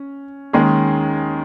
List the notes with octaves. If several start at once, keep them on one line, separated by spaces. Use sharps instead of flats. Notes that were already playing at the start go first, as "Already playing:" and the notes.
Already playing: C#4
D#2 D#3 G#3 C#4 G#4